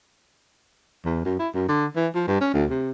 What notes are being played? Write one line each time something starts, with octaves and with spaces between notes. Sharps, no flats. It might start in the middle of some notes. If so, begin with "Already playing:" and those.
E2
F#2
E4
F#2
D3
E3
F3
G2
C#4
D2
C3